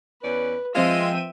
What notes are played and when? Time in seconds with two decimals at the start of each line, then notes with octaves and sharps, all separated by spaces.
0.23 E2 C#4 B4 D5
0.75 F3 G#3 C4 F4 D#5 E5 G5 D#7